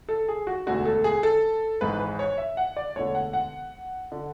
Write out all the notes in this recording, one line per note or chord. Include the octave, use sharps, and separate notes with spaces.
A4
G#4
F#4
E1 D2 D3 F#4
A4
G#4
A4
G#1 G#2 E3 B4
B4
C#5
E5
F#5
D5
E1 D2 D3 C#5
F#5
F#5
D3